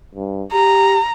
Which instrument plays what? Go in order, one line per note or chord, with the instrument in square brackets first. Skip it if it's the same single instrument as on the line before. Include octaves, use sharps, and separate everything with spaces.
[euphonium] G2
[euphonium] G4 [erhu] A#5